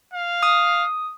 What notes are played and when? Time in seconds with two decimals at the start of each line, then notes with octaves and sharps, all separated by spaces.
0.14 F5
0.43 D#6